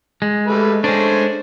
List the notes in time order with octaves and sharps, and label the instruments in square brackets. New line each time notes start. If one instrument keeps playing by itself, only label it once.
[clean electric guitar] G#3
[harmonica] G3 A3 B4
[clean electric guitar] G#3 D4 [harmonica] A3 C#4 C5